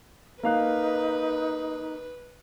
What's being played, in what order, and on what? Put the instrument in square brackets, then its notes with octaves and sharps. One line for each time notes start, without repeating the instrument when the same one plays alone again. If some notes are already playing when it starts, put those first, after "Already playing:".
[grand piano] A#3 F5 F#6 [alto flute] D#4 [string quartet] B4